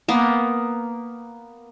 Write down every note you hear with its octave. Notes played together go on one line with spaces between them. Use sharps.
A#3 B3